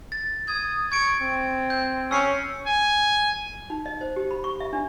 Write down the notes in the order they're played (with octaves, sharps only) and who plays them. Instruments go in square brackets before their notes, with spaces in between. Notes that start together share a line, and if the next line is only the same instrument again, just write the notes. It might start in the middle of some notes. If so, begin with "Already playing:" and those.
[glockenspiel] A6
[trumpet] D#6 [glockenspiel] G#6
[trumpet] C#6 [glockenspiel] G#6 D7
[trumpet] C4
[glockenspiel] G6
[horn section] C#4 [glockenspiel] E6 C7 C#7
[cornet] G#5
[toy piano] D#4
D#5
C5
G4
B5
C#6
E5
D4